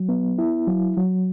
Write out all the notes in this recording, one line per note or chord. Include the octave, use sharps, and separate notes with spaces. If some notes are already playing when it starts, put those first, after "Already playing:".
Already playing: F#3
B3
E4
F#3
F#3